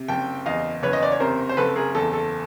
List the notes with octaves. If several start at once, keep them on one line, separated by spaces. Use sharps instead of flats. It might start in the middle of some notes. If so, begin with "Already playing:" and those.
Already playing: C3
F#1 G5 A5
E2 D#5 F5
F#1 B4 C#5
D#5
D5
C#5
C3 A#4 C5
C5
F#1 A4 B4
G#4 A#4
E2 A4
A4